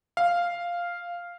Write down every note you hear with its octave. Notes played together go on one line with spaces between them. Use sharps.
F5